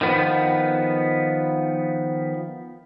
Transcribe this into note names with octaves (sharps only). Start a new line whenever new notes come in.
D#3 F3 B3